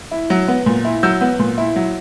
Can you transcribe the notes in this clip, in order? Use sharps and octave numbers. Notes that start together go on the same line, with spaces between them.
E4
F#3
B3
A#2
E4
F#3 E6 G6
B3
A#2
E4
F#3